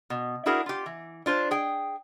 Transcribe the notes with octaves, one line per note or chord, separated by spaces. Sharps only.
B2
D4 E4 F#4 G#4 A#4
F4 G4
E3
D4 F4 C5
G#4 G5